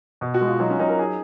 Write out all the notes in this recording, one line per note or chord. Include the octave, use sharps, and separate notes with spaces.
B2
F#4
G#3
F4
F#3 D#4
C#4
F#3 D#4
A#4
D#4 G#4